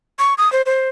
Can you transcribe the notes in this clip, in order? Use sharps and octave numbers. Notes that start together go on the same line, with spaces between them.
C#6
D#6
C5
C5